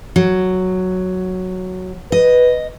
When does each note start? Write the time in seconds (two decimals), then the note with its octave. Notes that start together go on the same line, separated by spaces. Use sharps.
0.16 F#3
2.12 B4 D#5